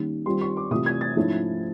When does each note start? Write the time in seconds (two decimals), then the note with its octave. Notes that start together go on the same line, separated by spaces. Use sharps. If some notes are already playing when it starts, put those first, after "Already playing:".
Already playing: D#3 G3 A#3 C#4
0.26 D#3 G3 C4 F4 C6
0.41 C#6
0.57 D6
0.71 C3 E3 A3 C4 F4 D#6
0.86 G#6
1.01 A6
1.16 G#2 F3 A3 C#4 E4